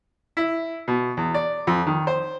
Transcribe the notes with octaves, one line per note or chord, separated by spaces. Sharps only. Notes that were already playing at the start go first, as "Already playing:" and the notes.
E4
B2
E2
D5
F2
D#3
C5